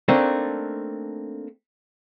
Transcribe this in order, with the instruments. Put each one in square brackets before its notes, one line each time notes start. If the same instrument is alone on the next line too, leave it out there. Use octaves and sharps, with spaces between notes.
[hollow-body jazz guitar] A3 A#3 C4 D4 D#4